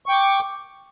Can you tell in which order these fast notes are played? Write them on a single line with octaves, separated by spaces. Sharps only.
C#6 G5 D6